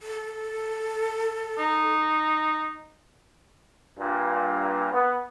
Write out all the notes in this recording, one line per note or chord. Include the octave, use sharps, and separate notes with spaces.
A4
D#4
G2 A#2
B3